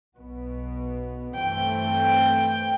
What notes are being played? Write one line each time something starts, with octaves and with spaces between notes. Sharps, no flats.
B1 B2 B3
G2 E3 A3 C4 G5